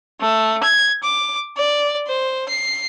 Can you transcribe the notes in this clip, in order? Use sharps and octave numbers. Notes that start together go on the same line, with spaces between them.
A3
G#6
D6
D5
C5
C7